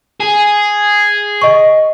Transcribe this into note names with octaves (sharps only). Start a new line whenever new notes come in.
G#4
D#5 C#6